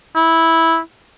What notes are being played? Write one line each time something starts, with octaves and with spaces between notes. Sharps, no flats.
E4